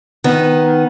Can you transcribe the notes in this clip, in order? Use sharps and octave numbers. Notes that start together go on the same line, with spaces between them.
D#3 B3